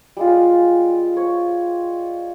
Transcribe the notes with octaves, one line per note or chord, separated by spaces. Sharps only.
G3 G#3 F4
C#5